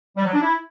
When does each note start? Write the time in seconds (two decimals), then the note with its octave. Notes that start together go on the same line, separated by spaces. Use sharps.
0.17 G3
0.25 F#3
0.33 D4
0.41 E4